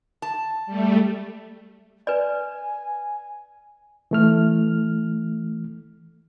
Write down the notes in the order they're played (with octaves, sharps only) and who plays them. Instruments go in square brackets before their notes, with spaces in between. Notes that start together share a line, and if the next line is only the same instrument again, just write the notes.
[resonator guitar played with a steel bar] A5
[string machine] G3 A3
[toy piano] B4 D5 [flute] G#5
[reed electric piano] E3 A3 F6